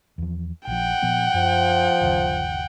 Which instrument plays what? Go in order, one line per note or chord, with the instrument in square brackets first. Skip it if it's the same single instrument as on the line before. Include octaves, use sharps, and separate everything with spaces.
[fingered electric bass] E2 F3
[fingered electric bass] A#1 F3 [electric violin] F#5 G5
[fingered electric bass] A#2 F3 B3
[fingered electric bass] F#2 [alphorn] F3
[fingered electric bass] G1 D#2 C#3